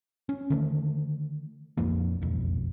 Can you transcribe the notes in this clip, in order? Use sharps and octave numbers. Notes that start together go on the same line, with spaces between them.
C#4
D3 D#3 A3
A#1 F2 F3 A#3
E1 B1 F2